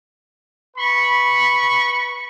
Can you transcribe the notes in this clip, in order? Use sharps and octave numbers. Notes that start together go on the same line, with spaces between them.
B4 B5 C#6